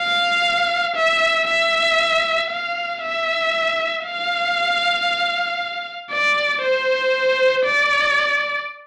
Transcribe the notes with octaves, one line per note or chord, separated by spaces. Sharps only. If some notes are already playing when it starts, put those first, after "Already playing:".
Already playing: F5
E5
E5
F5
E5
F5
D5
C5
D5